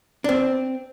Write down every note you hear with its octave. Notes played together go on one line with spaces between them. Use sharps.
D4
C4